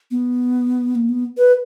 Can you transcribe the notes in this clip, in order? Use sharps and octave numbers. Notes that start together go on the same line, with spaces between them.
B3
A#3
B3
B4